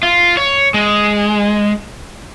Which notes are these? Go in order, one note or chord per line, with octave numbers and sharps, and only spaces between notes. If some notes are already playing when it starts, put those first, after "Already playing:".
F4
C#5
G#3